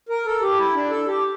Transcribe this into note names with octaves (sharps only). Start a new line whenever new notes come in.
A#4
A4
G4
E4
D4
A4
G4